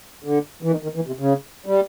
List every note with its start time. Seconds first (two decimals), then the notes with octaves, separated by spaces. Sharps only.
0.24 D3
0.63 E3
0.71 D#3
0.83 D#3
0.95 E3
1.07 C3
1.19 C#3
1.66 G3